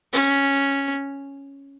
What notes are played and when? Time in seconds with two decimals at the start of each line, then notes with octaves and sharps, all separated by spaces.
0.13 C#4